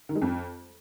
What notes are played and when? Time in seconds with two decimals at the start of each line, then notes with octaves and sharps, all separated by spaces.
0.09 D#3
0.15 G#3
0.22 F2